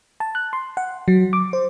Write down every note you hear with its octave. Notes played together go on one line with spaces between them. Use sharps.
A5
F#6
C6
F#5
F#3
D6
C5